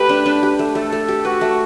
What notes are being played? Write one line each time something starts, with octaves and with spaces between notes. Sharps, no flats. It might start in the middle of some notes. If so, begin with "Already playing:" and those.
Already playing: A3 G4 B4
D4
D4
G4
A3
A3 A4
A3
G4
F#4 B4
A3